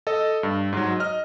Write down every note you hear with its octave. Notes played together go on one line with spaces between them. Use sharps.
A4 D#5
G2
G#2 F#3
D#5 F6